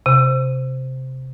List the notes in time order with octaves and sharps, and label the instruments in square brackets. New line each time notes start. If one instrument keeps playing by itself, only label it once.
[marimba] C3